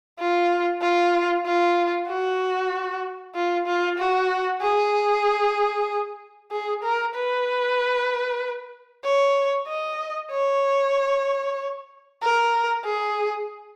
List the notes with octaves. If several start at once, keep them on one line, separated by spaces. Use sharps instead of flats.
F4
F4
F4
F#4
F4
F4
F#4
G#4
G#4
A#4
B4
C#5
D#5
C#5
A#4
G#4